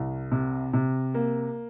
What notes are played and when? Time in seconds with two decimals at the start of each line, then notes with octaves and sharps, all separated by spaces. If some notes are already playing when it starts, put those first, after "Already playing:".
Already playing: C2
0.32 C3
0.73 C3
1.14 A#3